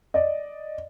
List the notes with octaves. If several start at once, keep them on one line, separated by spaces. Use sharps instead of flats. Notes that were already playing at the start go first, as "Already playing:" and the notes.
D5 D#5